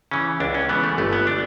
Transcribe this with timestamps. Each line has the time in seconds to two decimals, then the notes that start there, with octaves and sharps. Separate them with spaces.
0.11 C#3 E3 C#4
0.40 C#2 D4
0.54 C#4
0.69 C#3 E3 B3
0.84 A3
0.98 G1 A3
1.13 B3
1.27 D4